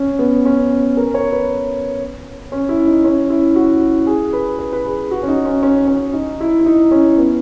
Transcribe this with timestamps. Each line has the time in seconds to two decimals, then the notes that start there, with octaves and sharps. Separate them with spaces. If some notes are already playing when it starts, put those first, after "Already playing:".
Already playing: C#4
0.19 B3
0.45 C#4
0.97 A#4
1.14 C#5
1.32 B4
2.52 C#4
2.69 E4
2.87 D#4
3.04 C#4
3.30 E4
3.56 F#4
4.07 G#4
4.33 B4
4.59 B4
4.73 B4
4.85 G#4
5.11 F#4
5.23 C#4
5.28 D#4
5.45 C#4
5.63 C#4
5.88 C#4
6.14 D#4
6.41 E4
6.59 E4
6.66 D#4
6.91 C#4
7.18 B3